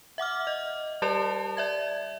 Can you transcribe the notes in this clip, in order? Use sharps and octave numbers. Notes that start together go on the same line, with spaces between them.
E5 F#5 D6 F6
D#5
G3 G4 A#4 D5 A5 F7
D5 E5 G#6